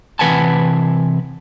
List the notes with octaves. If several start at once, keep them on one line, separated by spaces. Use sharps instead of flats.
C3 E3 B4 F#5 G#5 A5